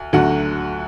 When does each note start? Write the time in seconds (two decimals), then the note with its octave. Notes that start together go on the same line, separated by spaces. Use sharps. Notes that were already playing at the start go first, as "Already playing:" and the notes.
Already playing: D2
0.13 D2 D3 F#3 A3 F#5